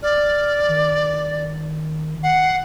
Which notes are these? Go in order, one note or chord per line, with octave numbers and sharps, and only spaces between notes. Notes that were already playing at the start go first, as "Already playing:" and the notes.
D5 F6
D#3
F#5 C7